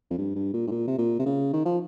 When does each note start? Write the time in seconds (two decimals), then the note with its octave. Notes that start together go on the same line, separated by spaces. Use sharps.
0.10 F2
0.18 G2
0.35 G2
0.54 A#2
0.67 G#2
0.71 A#2
0.88 C3
0.98 A#2
1.19 C3
1.26 C#3
1.53 D#3
1.65 F3